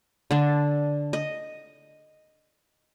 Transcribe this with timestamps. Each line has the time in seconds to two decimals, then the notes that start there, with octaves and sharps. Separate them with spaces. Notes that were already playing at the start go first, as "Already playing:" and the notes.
0.31 D3 D4
1.13 D#5